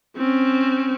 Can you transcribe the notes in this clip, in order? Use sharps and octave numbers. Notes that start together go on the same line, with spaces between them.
C4 C#4